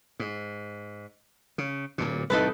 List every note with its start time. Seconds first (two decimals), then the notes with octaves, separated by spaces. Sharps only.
0.19 G#2
1.58 C#3
1.98 D1 D2 A#2
2.30 C2 A2 E3 D#4 A4 B4